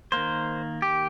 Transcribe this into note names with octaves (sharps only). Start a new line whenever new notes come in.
D#3 A#3 C5
G4